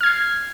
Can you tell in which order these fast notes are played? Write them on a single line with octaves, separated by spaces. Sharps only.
F6 G#6 C7